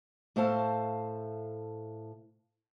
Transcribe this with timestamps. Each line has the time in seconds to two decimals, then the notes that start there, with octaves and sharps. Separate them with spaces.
0.36 A2 A3 A4 C5 F5 A5